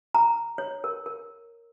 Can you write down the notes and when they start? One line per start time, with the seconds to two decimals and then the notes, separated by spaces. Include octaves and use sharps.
0.14 A#5
0.58 C#5
0.84 A#4
1.06 A#4